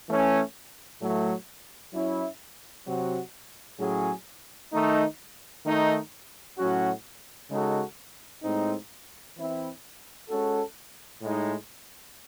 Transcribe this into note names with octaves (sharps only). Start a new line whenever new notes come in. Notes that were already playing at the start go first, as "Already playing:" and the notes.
E3 A3 C#4
A2 F#3 A3
F#3 C#4 E4
C3 F#3 C4 F#4
A2 F#3 C#4 G#4
D#3 A3 D#4
D#3 A3 D#4
A2 F#3 C#4 F#4
C#3 G#3 D#4 F#4 A4
A2 G#3 C4 D#4
E3 C4 E4
G#3 C#4 F#4 A4
A2 G#3 D#4